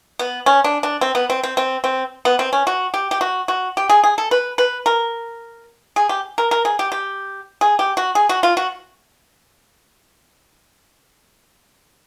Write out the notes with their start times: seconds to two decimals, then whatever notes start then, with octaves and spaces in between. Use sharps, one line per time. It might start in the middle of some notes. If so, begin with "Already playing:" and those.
0.19 B3
0.46 C#4
0.64 D4
0.83 D4
1.01 C4
1.15 B3
1.30 C4
1.43 C4
1.57 C4
1.84 C4
2.25 B3
2.39 C4
2.53 C#4
2.67 F#4
2.94 G4
3.11 G4
3.21 F#4
3.48 F#4
3.77 G4
3.89 G#4
4.04 G#4
4.18 A4
4.31 B4
4.58 B4
4.86 A#4
5.96 G#4
6.09 G4
6.38 A#4
6.51 A#4
6.65 G#4
6.79 G4
6.92 G4
7.61 G#4
7.79 G4
7.97 F#4
8.15 G#4
8.29 F#4
8.43 F4
8.57 F#4